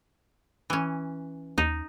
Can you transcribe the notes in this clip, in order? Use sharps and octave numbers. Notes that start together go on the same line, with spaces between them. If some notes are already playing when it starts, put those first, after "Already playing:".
E3 C#4
D#2 D#4